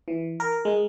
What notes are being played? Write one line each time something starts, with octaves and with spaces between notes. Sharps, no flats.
E3
A#4
G#3